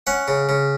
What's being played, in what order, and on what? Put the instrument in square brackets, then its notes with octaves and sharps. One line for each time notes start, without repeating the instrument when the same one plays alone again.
[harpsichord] C#4 F#5
C#3
C#3